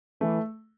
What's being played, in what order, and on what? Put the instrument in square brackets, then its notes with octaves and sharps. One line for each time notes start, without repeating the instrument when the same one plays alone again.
[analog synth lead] E3 [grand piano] A3